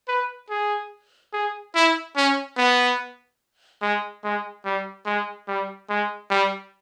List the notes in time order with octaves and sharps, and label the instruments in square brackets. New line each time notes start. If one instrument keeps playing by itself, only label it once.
[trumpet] B4
G#4
G#4
E4
C#4
B3
G#3
G#3
G3
G#3
G3
G#3
G3